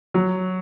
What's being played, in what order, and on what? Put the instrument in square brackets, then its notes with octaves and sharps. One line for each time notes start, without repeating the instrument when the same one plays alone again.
[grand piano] F#3